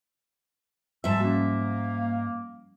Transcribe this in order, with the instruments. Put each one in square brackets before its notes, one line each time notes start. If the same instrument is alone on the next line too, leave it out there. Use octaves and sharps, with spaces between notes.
[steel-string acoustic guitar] G#2 E5 [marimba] F3 G3 G#3 [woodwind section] A5 E6
[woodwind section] A#3 [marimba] C#4 F#4